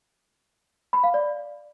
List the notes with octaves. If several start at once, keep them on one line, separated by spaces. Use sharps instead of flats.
B5
F5
D5